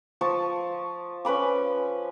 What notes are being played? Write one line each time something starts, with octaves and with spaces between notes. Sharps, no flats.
F3 A5 C#6
C#4 B4 B5 D6